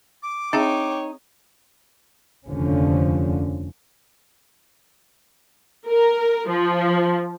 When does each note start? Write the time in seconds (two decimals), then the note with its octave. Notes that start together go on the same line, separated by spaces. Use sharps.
0.23 D6
0.53 C4 D#4 G#4 C#5 E5 G5
2.48 F1 D#2 D3 F3 C#4
5.87 A#4
6.49 F3